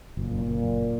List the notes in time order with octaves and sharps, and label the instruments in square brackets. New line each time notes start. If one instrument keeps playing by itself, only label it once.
[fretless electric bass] F#1 [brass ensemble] A#2
[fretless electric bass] F#1
F#1
F#1